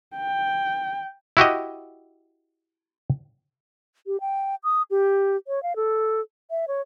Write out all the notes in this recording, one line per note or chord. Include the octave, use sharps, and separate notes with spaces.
G5
E4 F#4 G4 D#5
G4
G5
D#6
G4
C#5
F5
A4
E5
C#5